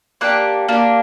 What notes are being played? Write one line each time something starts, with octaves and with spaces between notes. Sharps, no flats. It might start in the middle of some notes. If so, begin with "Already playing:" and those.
A#3 D4 G4 F#5
A#3 D4 G4